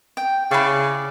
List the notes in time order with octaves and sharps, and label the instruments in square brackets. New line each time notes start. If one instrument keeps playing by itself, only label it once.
[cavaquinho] G5
[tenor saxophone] C#3 [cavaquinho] E4 D5